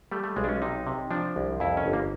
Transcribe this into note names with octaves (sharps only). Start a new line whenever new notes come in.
G3 A3
A3
B1 G#3
D4
C#4
C3 D#4
C3
F3 D4
C2
F2 E4
C#4
G1
A#3